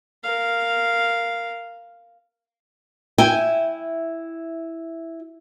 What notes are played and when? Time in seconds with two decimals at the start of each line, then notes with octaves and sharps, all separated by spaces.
0.24 A#4 F5
3.18 E4 G5 G#5